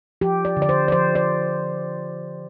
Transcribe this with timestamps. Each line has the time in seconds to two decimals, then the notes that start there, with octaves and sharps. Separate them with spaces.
0.21 F3 G4
0.45 D5
0.57 D3
0.62 D5
0.69 C5
0.88 D5
0.92 F3 C5
1.15 D5